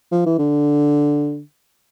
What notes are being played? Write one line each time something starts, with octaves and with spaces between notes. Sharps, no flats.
F3
E3
D3